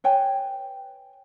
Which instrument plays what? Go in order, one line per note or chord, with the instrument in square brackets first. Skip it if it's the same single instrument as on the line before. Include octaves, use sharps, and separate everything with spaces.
[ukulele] B4 C#5 G5 G#5